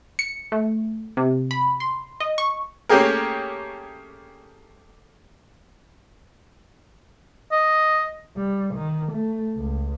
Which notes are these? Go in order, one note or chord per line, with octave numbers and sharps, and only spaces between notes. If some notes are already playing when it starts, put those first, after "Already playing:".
C#7
A3
C3
B5
C6
D#5
C#6
A3 A#3 C#4 G4 G#4 A#4
D#5
G3
D#3
A3
C#2